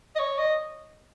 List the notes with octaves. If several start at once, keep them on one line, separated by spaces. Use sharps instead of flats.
D#5
C#5
D#5